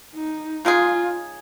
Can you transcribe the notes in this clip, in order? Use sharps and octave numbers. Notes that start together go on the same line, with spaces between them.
D#4
C#3 G#3 D#4 F4 G#4